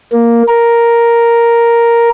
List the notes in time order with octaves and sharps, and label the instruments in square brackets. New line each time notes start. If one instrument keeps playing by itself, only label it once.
[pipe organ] A#3
A#4